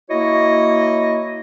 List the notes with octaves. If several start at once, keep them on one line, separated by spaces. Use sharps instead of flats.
A#3 E4 F#4 C#5 D#5